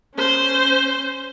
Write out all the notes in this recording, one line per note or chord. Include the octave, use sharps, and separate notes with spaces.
C#4 C5